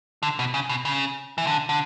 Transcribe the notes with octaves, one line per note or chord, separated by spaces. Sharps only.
D3
B2
C#3
B2
C#3
E3
D3
D3